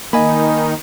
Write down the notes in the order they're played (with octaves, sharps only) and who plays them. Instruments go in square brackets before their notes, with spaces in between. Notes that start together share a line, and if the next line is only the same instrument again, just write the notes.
[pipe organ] D#3 D#4 [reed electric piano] A#3 [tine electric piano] D#5 G#5 B5